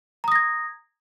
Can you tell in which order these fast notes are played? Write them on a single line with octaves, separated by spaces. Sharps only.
A#5 D#6 A#6 G#6